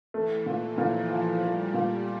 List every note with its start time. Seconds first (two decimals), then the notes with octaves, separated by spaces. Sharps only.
0.14 E3 A3
0.46 A#2
0.78 A#2 F3
1.10 F3
1.42 G3 A3
1.74 A#2